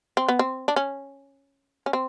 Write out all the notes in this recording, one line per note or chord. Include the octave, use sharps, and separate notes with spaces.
C4
B3
C4
D4
C#4
C#4
C4